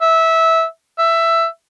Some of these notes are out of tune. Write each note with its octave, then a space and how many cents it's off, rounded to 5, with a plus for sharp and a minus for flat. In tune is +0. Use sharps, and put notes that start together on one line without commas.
E5 -15
E5 +10